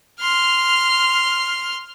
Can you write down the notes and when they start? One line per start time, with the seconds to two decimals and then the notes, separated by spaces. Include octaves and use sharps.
0.20 C6 F6